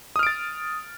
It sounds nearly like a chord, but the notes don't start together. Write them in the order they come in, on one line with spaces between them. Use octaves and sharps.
D#6 F6 D7 A6